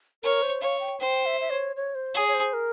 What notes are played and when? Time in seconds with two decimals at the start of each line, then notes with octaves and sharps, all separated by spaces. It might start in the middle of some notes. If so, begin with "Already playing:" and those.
0.23 A#4 C#5
0.42 C5
0.62 C#5 F5
0.80 G5
1.00 C5 G5
1.26 E5
1.41 E5
1.50 C#5
1.76 C#5
1.95 C5
2.14 G#4 C#5
2.28 C#5
2.34 C5
2.53 A#4